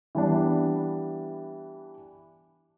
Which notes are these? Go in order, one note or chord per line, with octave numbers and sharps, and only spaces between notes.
E3 G3 B3 D4